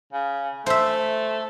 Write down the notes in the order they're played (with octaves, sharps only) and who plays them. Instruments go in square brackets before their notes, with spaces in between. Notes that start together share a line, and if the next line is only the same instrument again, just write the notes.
[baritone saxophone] C#3
[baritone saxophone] A3 [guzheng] C5 E5